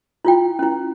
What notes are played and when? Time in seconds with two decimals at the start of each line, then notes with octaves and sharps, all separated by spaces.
0.25 E4 F4 G5
0.59 C#4 E4